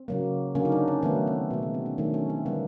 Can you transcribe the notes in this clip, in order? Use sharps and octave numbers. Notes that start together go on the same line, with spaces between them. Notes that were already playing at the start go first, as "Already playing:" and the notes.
Already playing: C4
C#3 F#3 A#3
D3 F#3 A#3 C#4
D#4
D4
C#4
D#3 F#3 A3 B3
C4
B2 G#3 B3
B3
C4
C#4
D#3 F#3 A3 D4
C#4
C4
D3 G3 A#3 B3